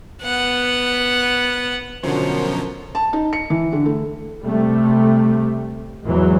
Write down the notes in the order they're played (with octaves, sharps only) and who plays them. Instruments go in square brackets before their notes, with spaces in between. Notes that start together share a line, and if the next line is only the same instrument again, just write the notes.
[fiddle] B3 F#5
[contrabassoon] F#2 [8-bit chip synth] B2 D3 F3 [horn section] A#4 C5 C#5
[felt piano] A5
D#4
C#7
E3
D3
A3
[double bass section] C3 G3 A3
E2 G#2 E3 F#3